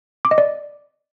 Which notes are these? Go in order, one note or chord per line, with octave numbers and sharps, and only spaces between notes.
D6
D#5
D5